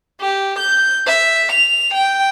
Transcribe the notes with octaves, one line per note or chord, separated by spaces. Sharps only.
G4
G6
E5
F7
G5